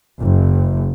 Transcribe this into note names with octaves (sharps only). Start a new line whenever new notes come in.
F#1